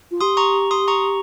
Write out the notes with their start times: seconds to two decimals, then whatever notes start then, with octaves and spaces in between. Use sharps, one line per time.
0.11 F4
0.21 G4 C6 D#6
0.37 A#5 C#6
0.71 C6 D#6
0.88 A#5 C#6